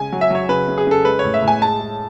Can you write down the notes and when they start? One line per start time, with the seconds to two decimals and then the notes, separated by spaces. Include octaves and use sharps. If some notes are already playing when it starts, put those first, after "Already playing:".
Already playing: C#3 G#3 G#5
0.12 F#3
0.21 E5
0.30 F#3 C#5
0.49 C#3 B4
0.68 C#3
0.78 G#4
0.87 C#3 A4
1.05 G#3 B4
1.19 A2 C#5
1.34 E5
1.42 A2
1.48 G#5
1.61 G#3 A5
1.80 G#3